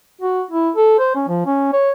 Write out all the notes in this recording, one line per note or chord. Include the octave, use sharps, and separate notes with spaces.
F#4
E4
A4
C5
C#4
F3
C#4
C#5